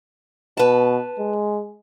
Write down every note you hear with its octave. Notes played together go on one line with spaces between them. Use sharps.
B2 B4 A5
G#3